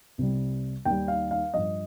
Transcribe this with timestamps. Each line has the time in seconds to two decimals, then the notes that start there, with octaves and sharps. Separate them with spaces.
0.18 C2 C3 G3
0.85 D#2 D#3 G3 G5
1.08 F5
1.31 F5
1.54 G2 F3 D#5